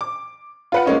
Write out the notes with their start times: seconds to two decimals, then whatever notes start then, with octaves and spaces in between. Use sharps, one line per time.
0.01 D6
0.72 F4 B4 F#5
0.86 G#3 A#3 C#4 D#4